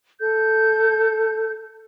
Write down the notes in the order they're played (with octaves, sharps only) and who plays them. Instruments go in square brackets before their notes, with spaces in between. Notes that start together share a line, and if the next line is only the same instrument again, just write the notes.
[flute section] A4 G6